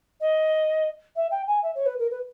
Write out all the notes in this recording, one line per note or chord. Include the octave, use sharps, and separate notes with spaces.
D#5
E5
G5
G#5
E5
C#5
B4
A#4
B4